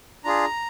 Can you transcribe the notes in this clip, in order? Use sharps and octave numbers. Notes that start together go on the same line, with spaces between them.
D4 F4 G#4 A#5